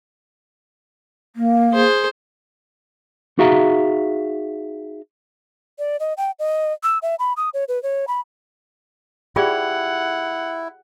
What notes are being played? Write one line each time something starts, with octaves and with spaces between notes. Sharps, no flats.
A#3
G#4 C5
D#4 F#4 G#4 E5 F5 A#5
D5
D#5
G5
D#5
E6
E5
B5
D#6
C#5
B4
C#5
B5
E4 F4 G4 G#4 D5 F#5